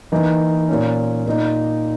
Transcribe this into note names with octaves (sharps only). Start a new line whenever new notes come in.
E3 A#3 D#4
A#2 A#3 C#4
A#2 A#3 D#4